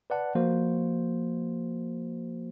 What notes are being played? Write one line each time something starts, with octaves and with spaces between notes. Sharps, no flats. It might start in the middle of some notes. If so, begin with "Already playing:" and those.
B4 D5 F#5 A5
F3 A#3 F#4 C5